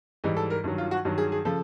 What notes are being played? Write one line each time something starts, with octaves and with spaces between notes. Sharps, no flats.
G#2 E3 G3 D#4
A4
A#4
G2 D#3 F#3
F4
F#4
G2 D#3 F#3
G#4
G#4
C#3 F3 A4